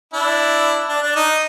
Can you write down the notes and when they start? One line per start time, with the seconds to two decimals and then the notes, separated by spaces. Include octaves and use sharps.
0.13 D4 E4
0.89 D4
1.02 D4
1.16 D#4